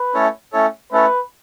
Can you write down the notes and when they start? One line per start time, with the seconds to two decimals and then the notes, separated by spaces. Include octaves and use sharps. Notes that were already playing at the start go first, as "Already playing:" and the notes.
Already playing: B4
0.14 A3 C#4 E4 A4 C#5
0.53 A3 C#4 E4 A4 C#5
0.92 A3 C#4 E4 A4 B4 C#5